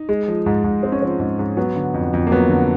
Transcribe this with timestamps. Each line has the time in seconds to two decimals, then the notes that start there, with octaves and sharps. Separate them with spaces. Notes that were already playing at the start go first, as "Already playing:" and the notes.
Already playing: D#4
0.09 G#3
0.28 F3
0.46 G#2
0.64 G#2
0.82 G#3 C4
0.92 C#4
1.02 F3 C4
1.19 G#2
1.39 G#2
1.57 F#3 B3
1.76 D3
1.94 F2
2.13 F2
2.27 A#3
2.31 F#3 B3
2.49 D3